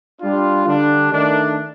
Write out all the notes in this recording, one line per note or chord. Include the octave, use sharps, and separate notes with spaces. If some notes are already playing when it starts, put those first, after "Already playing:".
G3 D4 F4
D3 G3 D4
D#3 A3 D4